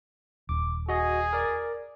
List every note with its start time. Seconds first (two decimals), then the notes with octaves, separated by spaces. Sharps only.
0.49 D#1 D6
0.89 F#4 G#4 D#5
1.33 A#4 D5